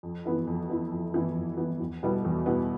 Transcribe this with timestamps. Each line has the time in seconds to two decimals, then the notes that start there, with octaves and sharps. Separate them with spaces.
0.03 F2
0.25 E3 B3 E4
0.47 F2
0.69 E3 B3 E4
0.92 F2
1.14 E3 B3 E4
1.35 F2
1.58 E3 B3 E4
1.80 E2
2.03 B2 G3 B3 E4
2.25 E2
2.46 B2 G3 B3 E4